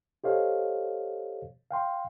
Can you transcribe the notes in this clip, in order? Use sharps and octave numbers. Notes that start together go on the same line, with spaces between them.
G4 A4 C5 C#5 D#5 F5
F5 G5 C6